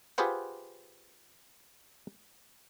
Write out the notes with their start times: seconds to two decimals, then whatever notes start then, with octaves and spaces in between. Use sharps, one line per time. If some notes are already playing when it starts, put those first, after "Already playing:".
0.18 F4 G4 G#4 B4 C5 F#5